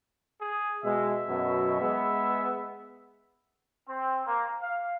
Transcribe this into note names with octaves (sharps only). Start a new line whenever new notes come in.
G#4
B2 G#3 E5
F#2 B2
G#3 B3
C4
A#3
F5